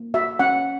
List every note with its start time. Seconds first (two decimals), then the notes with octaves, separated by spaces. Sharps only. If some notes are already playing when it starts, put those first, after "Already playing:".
Already playing: A#3
0.14 F#4 E5
0.39 C#4 F#5